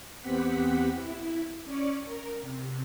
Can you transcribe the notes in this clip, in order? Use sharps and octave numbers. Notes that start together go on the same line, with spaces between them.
E2 B3 C4 G4 F#5 B6
E4
C#4 D5 C#6
A#4
C3